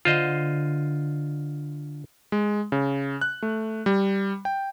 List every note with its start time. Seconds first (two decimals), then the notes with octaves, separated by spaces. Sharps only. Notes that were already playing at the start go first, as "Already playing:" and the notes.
0.05 D3 F4 C5 D#5
2.32 G#3
2.72 C#3
3.21 F#6
3.43 A3
3.86 G3
4.45 G5